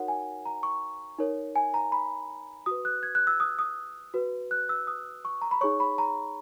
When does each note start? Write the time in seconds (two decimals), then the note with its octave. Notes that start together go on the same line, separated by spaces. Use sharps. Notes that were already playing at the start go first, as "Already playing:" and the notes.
Already playing: D#4 F#4 A#4 C#5 F#5
0.08 G#5
0.46 A#5
0.63 C#6
1.19 D#4 A#4 C#5
1.56 G#5
1.74 A#5
1.92 B5
2.66 F#4 B4 D#6
2.85 F#6
3.03 G#6
3.15 F#6
3.27 E6
3.40 D#6
3.59 D#6
4.14 F#4 B4
4.51 F#6
4.69 E6
4.87 D#6
5.25 C#6
5.42 A#5
5.51 B5
5.61 D#4 G#4 C#5 C#6
5.80 B5
5.98 A#5